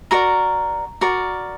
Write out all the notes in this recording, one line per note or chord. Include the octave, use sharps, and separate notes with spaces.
F#4 A#4 D5 A#5
F#4 A#4 D5